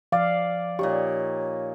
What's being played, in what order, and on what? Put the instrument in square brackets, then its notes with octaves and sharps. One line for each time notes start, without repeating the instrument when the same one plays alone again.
[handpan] F3 F5 [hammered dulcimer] D5
[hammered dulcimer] A#2 D#4 C#6 [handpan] G4 [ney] C#5